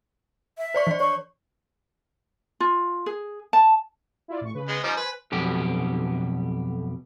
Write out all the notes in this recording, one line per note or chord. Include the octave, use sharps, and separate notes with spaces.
E5
C5 D5 C#6
E3 D5
C#5 C#6
F4
G#4
A5
E4 F4 D5
A1 C#6
C#3 B4
G#3 B3
F3 G3 D#4 C5 G#5
B4
B1 F2 B2 G4